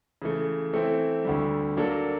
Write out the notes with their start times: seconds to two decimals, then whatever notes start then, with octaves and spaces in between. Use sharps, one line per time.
0.22 C#3 E3 A3
0.73 E3 A3 C4 E4
1.25 D2 D3 G3
1.77 F#3 A#3 D4 F#4 A4